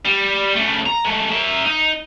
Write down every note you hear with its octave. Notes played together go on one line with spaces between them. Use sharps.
G3
C#3 A3
A#5
G#3 A3
A#4 E5
D#4